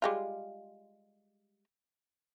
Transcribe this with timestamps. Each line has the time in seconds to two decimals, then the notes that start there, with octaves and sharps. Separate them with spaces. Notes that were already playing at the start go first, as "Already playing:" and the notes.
0.02 G3 G#3 F4